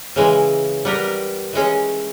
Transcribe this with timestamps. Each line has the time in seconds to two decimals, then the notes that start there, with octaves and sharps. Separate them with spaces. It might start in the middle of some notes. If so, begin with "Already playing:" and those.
0.16 C#3 E3 G#3
0.85 G3 B3 G4 A#4
1.53 E3 G#3 C#4